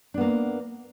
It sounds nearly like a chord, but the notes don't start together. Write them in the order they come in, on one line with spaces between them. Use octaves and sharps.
D4 B3 A#3